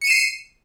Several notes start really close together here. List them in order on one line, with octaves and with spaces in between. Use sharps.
C#7 D#7 E7 C7